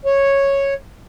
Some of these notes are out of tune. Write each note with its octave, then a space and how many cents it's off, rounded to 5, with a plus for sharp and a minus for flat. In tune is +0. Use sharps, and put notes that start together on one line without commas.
C#5 -5